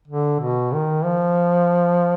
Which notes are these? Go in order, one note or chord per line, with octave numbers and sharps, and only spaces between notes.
D3
B2
D#3
F3